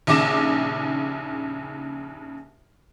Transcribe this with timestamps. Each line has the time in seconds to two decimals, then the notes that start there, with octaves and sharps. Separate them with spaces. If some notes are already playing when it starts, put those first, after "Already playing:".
0.07 A#1 D#2 C#3 D6 A#6 E7